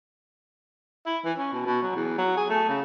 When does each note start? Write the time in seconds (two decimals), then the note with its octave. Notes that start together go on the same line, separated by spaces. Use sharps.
1.06 E4
1.25 E3
1.38 C#4
1.53 B2
1.66 B2
1.82 F#3
1.96 E2
2.18 F#3
2.37 G#4
2.50 A3
2.69 C#3